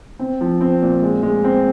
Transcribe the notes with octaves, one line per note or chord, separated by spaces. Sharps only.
C4
F3
C4
A#2
G#3
G#3
C4